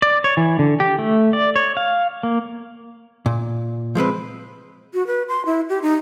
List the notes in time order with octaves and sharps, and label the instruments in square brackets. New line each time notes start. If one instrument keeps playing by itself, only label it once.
[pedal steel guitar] D5
C#5
E3
D3
G4
A3
D5
C#5
F5
A#3
[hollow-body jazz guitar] A#2
F3 G#3 C4 B4
[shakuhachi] F#4
B4
C6
E4
G4
D#4